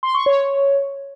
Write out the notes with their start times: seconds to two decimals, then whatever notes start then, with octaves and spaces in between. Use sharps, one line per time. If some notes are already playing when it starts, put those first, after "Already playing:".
0.03 C6
0.15 C#6
0.26 C#5